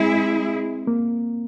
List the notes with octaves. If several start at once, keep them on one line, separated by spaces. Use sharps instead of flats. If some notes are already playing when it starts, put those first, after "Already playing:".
Already playing: G#3 C4 E4 G#4
A#3